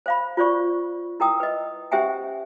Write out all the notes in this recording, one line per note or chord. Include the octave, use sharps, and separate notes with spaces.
C5 F5 B5
F4 C5 D5 C#6
E4 A#4 G5 D#6
B4 D#5
C#4 G4 C5 E5 G5 G#5